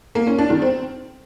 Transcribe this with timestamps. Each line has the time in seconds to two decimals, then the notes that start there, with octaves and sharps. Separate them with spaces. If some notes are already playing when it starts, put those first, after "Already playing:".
0.15 A#3
0.27 C#4
0.39 D4
0.50 D#3
0.62 C4